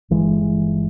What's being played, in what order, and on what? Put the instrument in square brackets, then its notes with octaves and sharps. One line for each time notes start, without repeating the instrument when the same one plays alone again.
[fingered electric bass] G1 E3 G#3